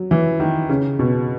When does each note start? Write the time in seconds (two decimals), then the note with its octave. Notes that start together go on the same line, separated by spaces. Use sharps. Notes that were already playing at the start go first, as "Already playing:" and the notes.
Already playing: F#3
0.11 E3
0.40 D#3
0.69 C#3
0.99 B2